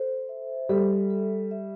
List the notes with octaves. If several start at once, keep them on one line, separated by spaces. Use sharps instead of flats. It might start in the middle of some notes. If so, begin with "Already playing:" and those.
Already playing: A4 C5
E5
G3 A4
A4
E5